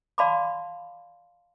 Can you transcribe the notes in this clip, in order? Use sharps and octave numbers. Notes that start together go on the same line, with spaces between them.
D5 F5 A5 B5 C6 D6